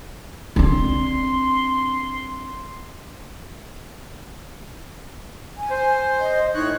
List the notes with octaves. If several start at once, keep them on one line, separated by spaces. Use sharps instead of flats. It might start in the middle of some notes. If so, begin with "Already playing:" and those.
C4 D4 C6
G#5
C5
D#5
A2 D#4 C#5 F#6